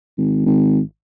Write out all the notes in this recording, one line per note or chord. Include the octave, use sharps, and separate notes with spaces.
G#1
G#1